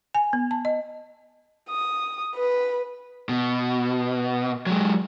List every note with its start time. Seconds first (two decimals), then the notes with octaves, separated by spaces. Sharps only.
0.14 G#5
0.33 B3
0.51 A5
0.65 D#5
1.70 D#6
2.35 B4
3.29 B2
4.66 F#3 G#3